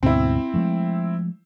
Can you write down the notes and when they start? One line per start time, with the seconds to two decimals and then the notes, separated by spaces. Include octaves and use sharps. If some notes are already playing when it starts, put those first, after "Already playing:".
0.03 D2 G#2 B2 C4 E4
0.54 F3 G#3 A3